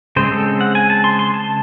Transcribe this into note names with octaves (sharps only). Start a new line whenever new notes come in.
C#3 G#3 C4 C5
A4
F#5
G#5
A5
C6
C6
A5